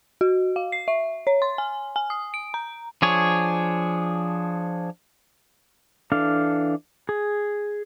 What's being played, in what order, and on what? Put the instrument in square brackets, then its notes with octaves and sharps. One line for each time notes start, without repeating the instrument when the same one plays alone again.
[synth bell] F#4
F5
C7
E5
C#5
C6
G#5
G#5
D#6
D7
A#5
[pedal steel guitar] F3 D4 G#4 C#5
E3 D4 A4 F5
G#4